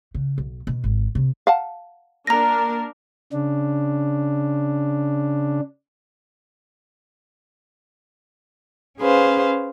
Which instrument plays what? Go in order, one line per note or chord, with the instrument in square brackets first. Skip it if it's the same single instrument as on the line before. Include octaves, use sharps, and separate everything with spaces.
[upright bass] C#3
B1
B2
G#1
C3
[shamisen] F5 F#5 A5
[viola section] A#3 D4 A#4 [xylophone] A#5 A#6
[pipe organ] C#3 D4
[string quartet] C#4 G#4 B4 C5 F5